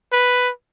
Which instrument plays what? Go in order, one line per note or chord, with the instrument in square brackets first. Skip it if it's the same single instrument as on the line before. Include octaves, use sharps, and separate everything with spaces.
[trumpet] B4